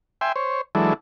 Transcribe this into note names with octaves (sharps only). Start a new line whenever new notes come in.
E5 G5 G#5 C6
C5 C#5
E3 F#3 G#3 D4 E4 A4